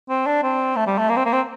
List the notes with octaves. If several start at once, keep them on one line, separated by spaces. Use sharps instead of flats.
C4
D4
C4
A3
G3
A3
A#3
C4
A#3
C4